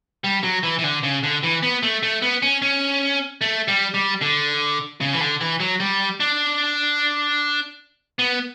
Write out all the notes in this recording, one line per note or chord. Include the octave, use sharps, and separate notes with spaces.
G3
F#3
E3
E3
D3
C#3
D3
E3
B3
A3
A3
B3
C#4
C#4
A3
G3
G3
D3
C#3
E3
D3
E3
F#3
G3
D4
B3